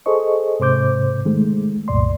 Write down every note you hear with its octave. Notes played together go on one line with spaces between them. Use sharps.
G#4 A4 C5 D#5 C#6
G#2 C3 C5 D6 G6
D#3 G#3 A3
C2 F#2 A#2 D5 C6